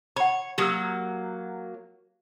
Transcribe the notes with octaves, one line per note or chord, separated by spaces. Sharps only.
C#5 F#5 B5
F#3 A#3 G4 D#6 E6